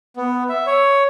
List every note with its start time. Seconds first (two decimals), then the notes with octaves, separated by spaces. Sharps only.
0.17 B3
0.49 E5
0.66 C#5